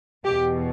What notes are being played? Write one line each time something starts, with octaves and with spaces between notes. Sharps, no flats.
E2 B2 G4